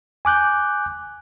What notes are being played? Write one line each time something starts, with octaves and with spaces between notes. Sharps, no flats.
G#5 D6 F#6 G6